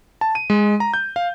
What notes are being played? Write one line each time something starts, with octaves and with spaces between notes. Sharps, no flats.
A5
D#7
G#3
A#5
G6
F5